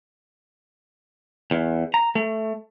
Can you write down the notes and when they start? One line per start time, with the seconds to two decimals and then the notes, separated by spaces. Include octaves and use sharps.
1.51 E2
1.94 A#5
2.15 A3